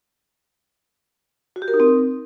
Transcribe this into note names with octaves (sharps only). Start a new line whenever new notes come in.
F#4
G4
A#4
D#4
C4